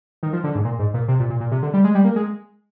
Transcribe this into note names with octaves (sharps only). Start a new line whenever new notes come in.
D#3
F3
D3
G#2
A#2
G#2
A#2
C3
A#2
A#2
A#2
C3
D3
G3
G#3
G3
A#3
G#3